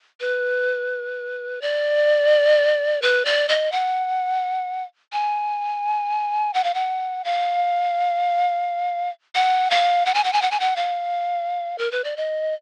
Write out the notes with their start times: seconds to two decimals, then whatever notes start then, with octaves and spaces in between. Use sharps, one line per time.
0.20 B4
1.61 D5
3.02 B4
3.25 D5
3.49 D#5
3.72 F#5
5.13 G#5
6.54 F#5
6.64 F5
6.74 F#5
7.24 F5
9.35 F#5
9.70 F5
10.06 F#5
10.14 G#5
10.24 F#5
10.33 G#5
10.42 F#5
10.51 G#5
10.60 F#5
10.76 F5
11.78 A#4
11.91 B4
12.04 D5
12.17 D#5